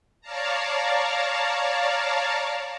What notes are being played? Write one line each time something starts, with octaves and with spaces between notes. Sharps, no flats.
C#5 D5 F5 A5 A#5